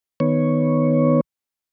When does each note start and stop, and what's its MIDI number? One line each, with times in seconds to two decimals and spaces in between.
0.20 1.21 51
0.20 1.21 59
0.20 1.21 73